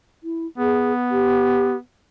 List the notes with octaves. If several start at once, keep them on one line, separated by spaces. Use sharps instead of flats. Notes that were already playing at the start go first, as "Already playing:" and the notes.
E4
B3 G#4
G4